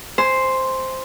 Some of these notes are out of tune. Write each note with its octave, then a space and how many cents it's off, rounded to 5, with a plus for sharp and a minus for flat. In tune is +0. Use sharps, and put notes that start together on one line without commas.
C5 +0 G#5 +0